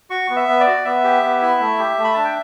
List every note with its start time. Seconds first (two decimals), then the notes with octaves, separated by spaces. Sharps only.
0.10 F#4 C#6
0.30 B3
0.36 E5
0.48 B3
0.60 D5
0.67 F#4
0.85 B3 E5
1.04 G4
1.23 B3
1.42 E4
1.61 A3
1.79 G4
1.98 A3
2.04 B5
2.14 D4 A5
2.24 G5